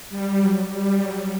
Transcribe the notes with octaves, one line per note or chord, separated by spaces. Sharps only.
G3
F#3
G3
F#3